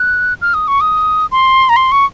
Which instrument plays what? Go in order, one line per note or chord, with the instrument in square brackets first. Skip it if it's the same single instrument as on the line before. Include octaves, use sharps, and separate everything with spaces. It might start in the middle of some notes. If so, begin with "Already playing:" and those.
Already playing: [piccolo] F#6
F6
D#6
C#6
D#6
C6
A#5
C6
C#6